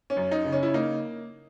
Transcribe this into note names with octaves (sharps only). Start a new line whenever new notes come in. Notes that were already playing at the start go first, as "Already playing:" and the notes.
C#4
F#2
D#4
C#3
C#4
E4
A#3 D#4